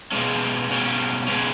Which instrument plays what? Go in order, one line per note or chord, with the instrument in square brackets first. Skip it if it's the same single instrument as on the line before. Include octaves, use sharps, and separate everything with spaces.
[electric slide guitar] B2 G#3 C#4
B2 G#3 C#4
B2 G#3 C#4